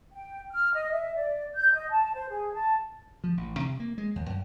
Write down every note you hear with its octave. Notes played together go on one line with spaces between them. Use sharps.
G5
F6
D#5
E5
D5
G6
D#5
A5
C5
G#4
A5
F3
A1
C3
A#3
G#3
D#2
F#2